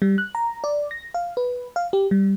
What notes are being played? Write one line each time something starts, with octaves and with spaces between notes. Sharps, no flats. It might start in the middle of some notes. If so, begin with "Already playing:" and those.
G3
F#6
A#5
D5
A#6
F5
B4
F5
G4
G3